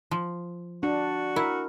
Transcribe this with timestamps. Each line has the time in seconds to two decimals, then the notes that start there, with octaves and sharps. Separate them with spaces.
0.11 F3
0.83 D4 F#4
1.36 E4 A#4